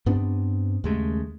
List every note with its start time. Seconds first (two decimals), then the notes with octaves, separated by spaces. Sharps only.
0.06 G2 B3 C4 D4
0.84 D#2 C#3 G#3 A3